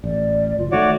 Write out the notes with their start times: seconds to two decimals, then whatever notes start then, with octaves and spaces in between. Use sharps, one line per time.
0.04 A1 D5
0.59 F#1 F4
0.72 D#3 A3 F#4 C#5 D5 E5